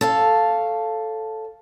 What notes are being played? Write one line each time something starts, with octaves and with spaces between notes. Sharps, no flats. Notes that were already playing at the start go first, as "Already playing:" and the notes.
A4 C#5 F5